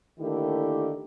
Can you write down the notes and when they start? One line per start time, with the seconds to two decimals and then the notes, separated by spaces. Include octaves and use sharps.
0.20 D3 D#3 A3 A#3 E4 G4